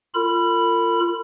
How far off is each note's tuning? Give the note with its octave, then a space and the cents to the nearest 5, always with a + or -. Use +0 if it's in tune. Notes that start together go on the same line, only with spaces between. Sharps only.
F4 -10 A#4 -45 B5 +0